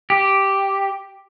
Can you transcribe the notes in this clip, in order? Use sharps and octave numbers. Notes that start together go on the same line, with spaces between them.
G4